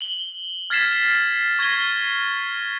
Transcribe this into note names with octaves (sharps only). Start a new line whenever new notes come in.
F#7 G7
F6 G#6 A6 B6 C7 E7
C#6 G#6 A#6 G7